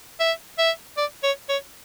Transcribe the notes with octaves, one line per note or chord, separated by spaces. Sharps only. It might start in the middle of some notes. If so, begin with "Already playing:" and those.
E5
E5
D5
C#5
C#5